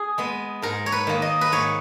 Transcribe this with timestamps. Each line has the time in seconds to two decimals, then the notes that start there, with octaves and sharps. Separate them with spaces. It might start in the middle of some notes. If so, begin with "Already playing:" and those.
Already playing: G#4
0.18 G#3 B3
0.62 G#2 A#4
0.86 C#5
0.92 B4
1.07 D#3 A#3
1.22 D#5
1.41 B4
1.52 G#2 C#5